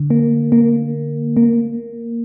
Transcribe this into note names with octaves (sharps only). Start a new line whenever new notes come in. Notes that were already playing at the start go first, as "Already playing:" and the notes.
Already playing: D3
A#3
A#3
A#3